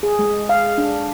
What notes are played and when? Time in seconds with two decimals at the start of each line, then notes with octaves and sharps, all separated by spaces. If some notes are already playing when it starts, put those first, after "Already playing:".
0.03 G#4
0.19 G#3
0.49 F5
0.78 D4